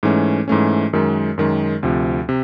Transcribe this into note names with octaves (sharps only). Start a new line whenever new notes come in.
G#2 E3 A3 C#4
G#2 E3 A3 C#4
F#2 D#3 G#3
F#2 D#3 G#3
D2 C3 F3
C3